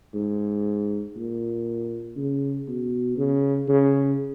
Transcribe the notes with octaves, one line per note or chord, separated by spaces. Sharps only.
G#2
A#2
C#3
B2
C#3
C#3